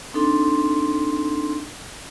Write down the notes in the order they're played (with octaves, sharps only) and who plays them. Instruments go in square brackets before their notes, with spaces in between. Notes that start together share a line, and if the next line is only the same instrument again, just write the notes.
[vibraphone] C4 D4 D#4 A4 C6